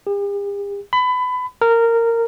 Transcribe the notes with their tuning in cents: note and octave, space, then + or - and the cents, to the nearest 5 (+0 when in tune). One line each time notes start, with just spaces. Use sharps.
G4 +45
B5 +25
A#4 -15